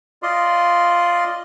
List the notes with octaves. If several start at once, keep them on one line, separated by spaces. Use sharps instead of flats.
F4 D5 D#5 C6